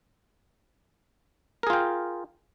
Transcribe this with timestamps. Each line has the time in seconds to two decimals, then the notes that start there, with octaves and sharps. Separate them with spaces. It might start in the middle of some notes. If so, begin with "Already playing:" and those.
1.63 A#4
1.67 G#4
1.70 F4
1.73 G5